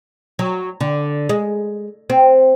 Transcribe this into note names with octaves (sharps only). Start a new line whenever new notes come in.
F#3
D3
G#3
C4